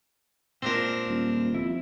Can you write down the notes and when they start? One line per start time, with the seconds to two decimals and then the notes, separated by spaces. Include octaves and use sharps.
0.62 A#2 G#3 C4 D4 F4 A#4
1.08 D#1
1.54 F2 E4